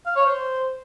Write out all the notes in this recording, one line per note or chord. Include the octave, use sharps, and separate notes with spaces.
F5
C#5
C5